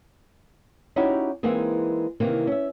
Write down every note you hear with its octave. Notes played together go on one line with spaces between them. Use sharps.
C#4 D#4 E4 F#4 G4
E3 G#3 A#3 C4 D#4 G#4
C3 D#3 E3 A#3 C4
C#4 E5